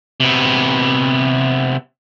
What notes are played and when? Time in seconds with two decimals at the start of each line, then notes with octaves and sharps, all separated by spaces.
0.20 C3 B3